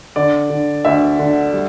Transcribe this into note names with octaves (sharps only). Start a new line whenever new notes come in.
D3 D5
D3
D2 E5
D3
G3